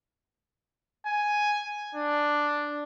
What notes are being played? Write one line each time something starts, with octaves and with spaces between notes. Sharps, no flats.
G#5
D4